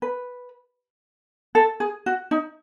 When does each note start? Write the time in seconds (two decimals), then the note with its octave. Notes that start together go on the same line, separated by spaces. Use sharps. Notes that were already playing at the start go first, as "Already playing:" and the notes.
0.02 B4
1.55 A4
1.80 G#4
2.06 F#4
2.31 D#4